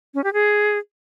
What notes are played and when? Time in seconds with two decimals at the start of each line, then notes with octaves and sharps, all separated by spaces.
0.14 C#4
0.24 G4
0.33 G#4